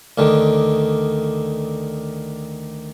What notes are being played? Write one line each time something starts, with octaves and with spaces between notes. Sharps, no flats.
D2 D3 D#3